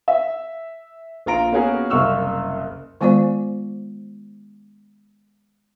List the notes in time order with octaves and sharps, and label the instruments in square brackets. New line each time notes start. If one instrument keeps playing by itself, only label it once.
[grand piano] E5
A#1 F4 A#5 D7
A#3 B3 C#4 F#4 G#4 A#4
F#1 C2 F5 C#6 E6 F6
[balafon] D#3 G#3 B3 F4 C5 D5